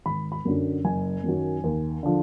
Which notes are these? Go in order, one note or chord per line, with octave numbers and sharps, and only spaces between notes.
G#1 B5
B5
F#2 D3 F#3
F#1 G#5
F#2 D#3 F#3
D#2
D3 F3